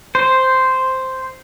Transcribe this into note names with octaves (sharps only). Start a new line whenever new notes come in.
C5